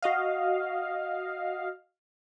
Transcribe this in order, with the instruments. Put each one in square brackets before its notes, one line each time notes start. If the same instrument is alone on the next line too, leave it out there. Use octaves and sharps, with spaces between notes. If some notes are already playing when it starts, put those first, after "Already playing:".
[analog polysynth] F#4 D#5 F5